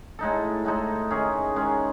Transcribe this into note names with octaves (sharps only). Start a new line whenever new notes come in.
A2 G#3 D#4 A4
A2 G#3 D#4 A4
D#3 G#3 C#4 G#4
D#3 G#3 C#4 G#4